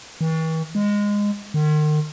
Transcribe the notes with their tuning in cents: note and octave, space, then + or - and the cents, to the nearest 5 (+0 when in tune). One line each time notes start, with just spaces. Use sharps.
E3 -45
G#3 -15
D#3 -40